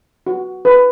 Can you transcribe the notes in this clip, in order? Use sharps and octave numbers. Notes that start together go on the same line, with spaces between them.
F#4
B4